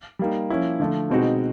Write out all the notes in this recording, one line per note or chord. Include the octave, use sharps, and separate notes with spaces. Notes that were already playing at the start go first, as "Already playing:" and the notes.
G3 A#3 D#4
F3 A#3 C#4 E4
D3 F3 A3
B2 G#3 C4 D#4 F#4